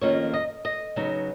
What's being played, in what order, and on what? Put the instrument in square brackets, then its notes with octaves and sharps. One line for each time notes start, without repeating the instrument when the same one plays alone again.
[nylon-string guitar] F2 D#3 A#3 C#4 F4 C#5
D#5
D#5
C#3 F#3 B3 D#4